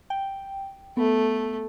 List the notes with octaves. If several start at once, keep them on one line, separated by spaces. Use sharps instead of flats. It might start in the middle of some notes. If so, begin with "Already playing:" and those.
G5
A3 B3